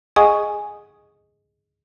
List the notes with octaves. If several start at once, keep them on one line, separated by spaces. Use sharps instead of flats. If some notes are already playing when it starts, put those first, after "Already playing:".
G#4 D#5 F#5 G#5 C#6 D#6